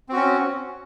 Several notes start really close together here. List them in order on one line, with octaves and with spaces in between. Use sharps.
C4 F#4 C#4